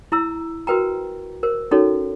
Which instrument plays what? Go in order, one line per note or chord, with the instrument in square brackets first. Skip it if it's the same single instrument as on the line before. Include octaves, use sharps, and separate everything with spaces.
[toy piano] E4 A#5 E6
F#4 A#4 B4 G5 A#5
A#4 C5
C#4 D#4 F#4 A4 C#5